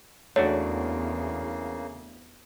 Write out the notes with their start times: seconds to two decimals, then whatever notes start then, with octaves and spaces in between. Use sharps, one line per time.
0.36 E2 C#3 A3 A#3 D4 F#4 C#5